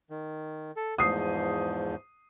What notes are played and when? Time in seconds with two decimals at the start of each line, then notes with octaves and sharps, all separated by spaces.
0.10 D#3
0.76 A4
0.98 E2 G#2 F3 D#6 C7